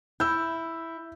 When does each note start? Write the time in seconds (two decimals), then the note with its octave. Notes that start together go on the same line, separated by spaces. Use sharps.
0.20 E4 E6 G6